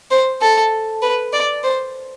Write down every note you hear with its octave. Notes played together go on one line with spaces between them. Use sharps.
C5
A4
B4
D5
C5